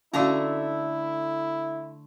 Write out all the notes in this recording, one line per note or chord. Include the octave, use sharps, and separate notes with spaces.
D3 A3 C#4 E4 F#4 F5 A#5